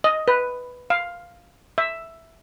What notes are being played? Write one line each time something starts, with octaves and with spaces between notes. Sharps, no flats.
D#5
B4
F5
E5